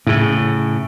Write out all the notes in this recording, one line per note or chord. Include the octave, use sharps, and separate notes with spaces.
A2 C#3